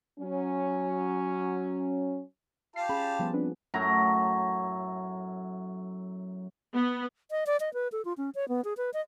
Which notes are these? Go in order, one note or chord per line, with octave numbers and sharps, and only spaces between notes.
F#3 C#4
F4 G4 A5 C7
C#4 G#4 B5
F3 G3 B3
C4 D4 B4
F#2 A2 F#3 A#5
B3
D#5
D5
D#5
B4
A4
F4
C#4
C#5
B3
G#4
B4
D#5